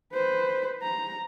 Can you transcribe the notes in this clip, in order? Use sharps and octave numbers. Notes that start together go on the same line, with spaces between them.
B4 C5
A#5